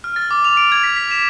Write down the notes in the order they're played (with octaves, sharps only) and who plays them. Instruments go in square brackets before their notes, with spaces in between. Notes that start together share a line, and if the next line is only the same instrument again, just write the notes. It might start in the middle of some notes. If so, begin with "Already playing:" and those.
[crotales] F6
A6
D6
F7
D7
G#6
B6
B6
E7